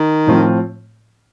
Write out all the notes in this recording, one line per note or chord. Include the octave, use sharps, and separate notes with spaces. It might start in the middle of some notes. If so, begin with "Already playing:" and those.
Already playing: D#3
A2 F3 C4 F4